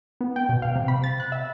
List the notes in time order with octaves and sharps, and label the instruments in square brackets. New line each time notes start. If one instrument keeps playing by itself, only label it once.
[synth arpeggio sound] B3
G5
B2
F5
C3
B5
A6
F#6
E5